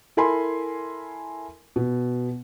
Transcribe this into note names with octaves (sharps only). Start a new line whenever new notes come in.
E4 A4 A#4 G#5 B5 C6
B2